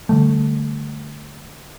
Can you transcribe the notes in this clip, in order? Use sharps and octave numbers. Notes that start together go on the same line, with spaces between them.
D3 G3 A3